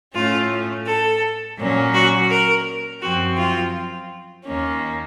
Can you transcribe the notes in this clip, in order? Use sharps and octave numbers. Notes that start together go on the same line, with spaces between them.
A2 A3 C#4 F4
A4
A#2 F#3 A#3 C#4
F#4
A#4
F#2 F3 C4 F#4
F4
D#2 D#3 A#3 C#4